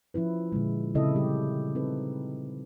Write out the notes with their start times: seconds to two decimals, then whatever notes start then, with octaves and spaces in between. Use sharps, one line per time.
0.14 F3 C#4 E4 B4
0.52 A#2 D3 G#3
0.95 C#3 C4 E4 A4 D#5
1.15 G3 G4
1.75 C4 D#4 A4 B4